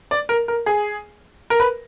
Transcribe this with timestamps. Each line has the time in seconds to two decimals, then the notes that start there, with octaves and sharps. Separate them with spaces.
0.11 D5
0.29 A#4
0.48 A#4
0.66 G#4
1.50 A#4
1.60 B4